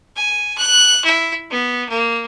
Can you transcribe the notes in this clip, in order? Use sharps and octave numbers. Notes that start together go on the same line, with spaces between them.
G#5
F#6
E4
B3
A#3